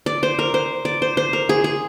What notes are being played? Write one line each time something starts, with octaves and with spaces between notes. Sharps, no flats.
D5
C5
A#4
C5
D5
C5
C5
A#4
G#4
G#4